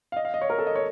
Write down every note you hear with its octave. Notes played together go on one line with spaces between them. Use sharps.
F5
D#5
F5
D#5
C#5
A#4
A4
D#5
C#5